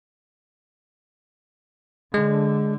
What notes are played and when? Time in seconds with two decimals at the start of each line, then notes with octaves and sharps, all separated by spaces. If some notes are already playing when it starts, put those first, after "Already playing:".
2.14 D3 G#3